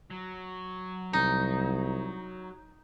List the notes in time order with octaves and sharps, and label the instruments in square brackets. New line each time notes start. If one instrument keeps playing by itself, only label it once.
[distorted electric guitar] F#3
[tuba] C2 [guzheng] D#4